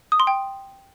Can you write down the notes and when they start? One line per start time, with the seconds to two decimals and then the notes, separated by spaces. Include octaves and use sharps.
0.12 D#6
0.20 C6
0.27 G5